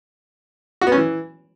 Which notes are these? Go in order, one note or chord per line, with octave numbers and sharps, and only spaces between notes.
F#4
B3
C#4
E3